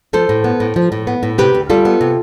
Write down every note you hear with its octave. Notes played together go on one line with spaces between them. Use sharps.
F3 A4 C5
A2
B3
A2
F3
A2
B3
A2
C3 G4 B4
D2
G3 F4 A4
B3
C3